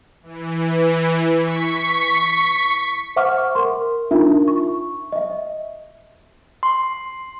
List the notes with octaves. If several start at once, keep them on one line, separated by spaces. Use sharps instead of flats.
E3
C#6 B6
C5 E5 F#5 C#6 D6 F6
A#4 C6
D4 D#4 F4 A#4 E5
C#6
D#5 E5
C6